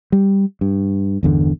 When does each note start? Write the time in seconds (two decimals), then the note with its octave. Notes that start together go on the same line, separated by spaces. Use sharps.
0.12 G3
0.61 G2
1.23 G1 E2 D3